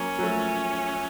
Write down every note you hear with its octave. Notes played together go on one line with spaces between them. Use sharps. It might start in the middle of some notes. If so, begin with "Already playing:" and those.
Already playing: F#3 A#3 C#4
F#3
F3 A3